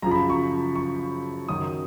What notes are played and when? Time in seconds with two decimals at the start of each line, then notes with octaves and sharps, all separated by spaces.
0.02 F#2 C#3 F3 A#5
0.11 B5
0.30 C#6
0.75 C#6
1.48 F#2 D#3 F#3 D#6